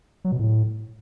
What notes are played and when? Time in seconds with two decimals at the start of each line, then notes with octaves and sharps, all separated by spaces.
0.25 F#3
0.32 B2
0.39 A2